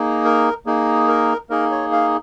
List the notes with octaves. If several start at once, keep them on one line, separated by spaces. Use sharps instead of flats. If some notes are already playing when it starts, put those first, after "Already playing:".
Already playing: A#3 D#4 G#4
A#4
A#3 D#4 G#4
A#4
A#3 D#4 G#4 A#4
C#5
F5